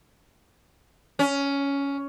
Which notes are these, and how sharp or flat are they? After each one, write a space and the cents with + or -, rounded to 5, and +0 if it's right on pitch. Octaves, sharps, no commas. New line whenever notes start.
C#4 +10